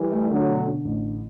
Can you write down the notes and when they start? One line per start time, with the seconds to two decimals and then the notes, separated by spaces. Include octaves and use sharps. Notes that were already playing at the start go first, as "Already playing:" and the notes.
Already playing: E3 G3
0.12 A3
0.30 D3 F#3 A3
0.49 B2
0.67 D3
0.85 A1